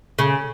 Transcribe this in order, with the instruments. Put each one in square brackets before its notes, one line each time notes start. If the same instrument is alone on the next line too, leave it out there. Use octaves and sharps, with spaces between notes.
[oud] C#3